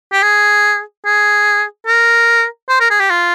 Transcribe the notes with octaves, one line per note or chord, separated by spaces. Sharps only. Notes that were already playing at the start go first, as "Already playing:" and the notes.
G4
G#4
G#4
A#4
C5
A#4
G#4
G4
F4